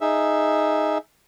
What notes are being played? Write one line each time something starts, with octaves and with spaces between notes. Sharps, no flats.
D#4 G#4 E5